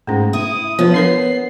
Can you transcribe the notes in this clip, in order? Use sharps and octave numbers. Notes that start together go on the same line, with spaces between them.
G#2 A3 C#4
E4 D#6
F3 B3 B4 C#5
D4 A#4 C#5 C7